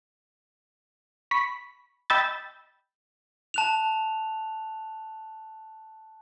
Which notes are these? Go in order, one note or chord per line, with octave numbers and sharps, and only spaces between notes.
B5 C#6 B6
D#5 G5 B5 E6 G6 A6
A5 F#6 F7